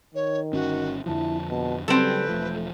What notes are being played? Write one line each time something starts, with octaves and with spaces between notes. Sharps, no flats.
D#3 C#5
G1 C#4 F#4
F2 D3 F3 E4 A5
B2 A5
C#3 F#3 G3 C4 A4 B4
E1 F3 A3